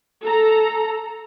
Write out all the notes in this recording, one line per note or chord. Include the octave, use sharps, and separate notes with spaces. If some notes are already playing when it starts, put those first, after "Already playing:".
A4 A#5